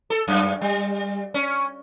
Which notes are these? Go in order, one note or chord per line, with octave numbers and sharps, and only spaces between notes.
A4
F#2
G3
C#4